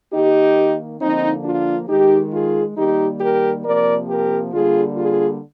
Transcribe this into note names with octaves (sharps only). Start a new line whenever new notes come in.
D#3 A#3 D#4 G4
D3 F3 A#3 C4 D#4
D4 F4
D#3 G#3 D#4 G4
F4 G#4
D#3 G3 A#3 D#4 G4
G4 A#4
C3 F3 A#3 A#4 D5
G4 A#4
D3 G3 A#3 F4 G#4
F4 G#4